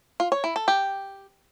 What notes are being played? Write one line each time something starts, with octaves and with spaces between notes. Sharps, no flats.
F4
C#5
E4
A4
G4